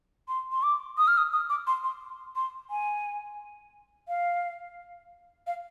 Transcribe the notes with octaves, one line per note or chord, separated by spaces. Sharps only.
C6
C6
D6
D#6
F6
D#6
D#6
D6
C6
C6
C6
G#5
F5
F5